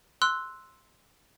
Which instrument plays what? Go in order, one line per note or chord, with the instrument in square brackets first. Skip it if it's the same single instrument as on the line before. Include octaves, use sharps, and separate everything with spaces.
[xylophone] C6 E6 F#6